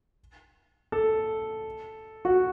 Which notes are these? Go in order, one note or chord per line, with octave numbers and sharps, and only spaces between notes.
A4
F#4